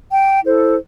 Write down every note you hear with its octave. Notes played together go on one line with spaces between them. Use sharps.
G5
E4 A4 C5